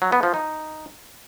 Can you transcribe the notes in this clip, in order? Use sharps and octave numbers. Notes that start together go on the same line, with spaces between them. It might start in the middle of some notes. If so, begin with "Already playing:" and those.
F#3
B3
F3
D#4